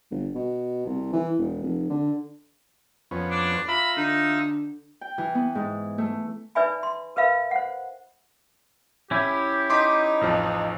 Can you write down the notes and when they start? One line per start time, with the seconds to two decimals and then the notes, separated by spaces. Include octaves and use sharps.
0.11 G1
0.35 B2
0.86 C2
1.13 E3
1.38 E1
1.62 F1
1.90 D3
3.11 F2 B3 C#4
3.30 D4
3.68 F4 E5 A#5 B5
3.97 D3 D#4
5.01 G5
5.18 E3
5.35 B3
5.55 G#2
5.98 A3
6.55 D#4 B4 D5 E5 G#5 B5
6.83 C6
7.16 A#4 B4 E5 F5 B5
7.51 C5 F#5
9.11 C#4 E4 G4
9.70 D#4 C6 D6 B6
10.21 A1 F2 F3